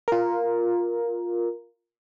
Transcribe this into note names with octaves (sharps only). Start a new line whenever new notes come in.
F4 A#4